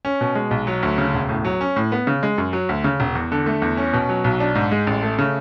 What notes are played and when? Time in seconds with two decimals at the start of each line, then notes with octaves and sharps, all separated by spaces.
0.05 C#4
0.21 B2
0.35 G#3
0.51 B1
0.67 F#3
0.83 D2
0.98 C#3
1.14 E1
1.29 A2
1.45 F#3
1.61 C#4
1.76 A2
1.92 B3
2.07 C#3
2.23 G#3
2.38 F#2
2.53 F#3
2.69 D2
2.84 C#3
3.00 E1
3.15 E2
3.32 D3
3.46 A3
3.62 E2
3.77 C#4
3.93 B2
4.09 F#3
4.24 B1
4.40 D4
4.55 G#2
4.71 G#3
4.87 A1
5.03 A3
5.19 C#3